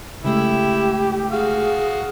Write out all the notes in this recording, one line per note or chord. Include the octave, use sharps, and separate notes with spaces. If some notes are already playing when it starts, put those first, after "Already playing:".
C#3 G#3 A3 E4 G4
F#4 G#4 F5